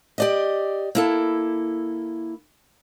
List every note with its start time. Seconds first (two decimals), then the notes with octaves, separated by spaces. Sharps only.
0.18 G4 D5 D#5
0.95 A#3 E4 A4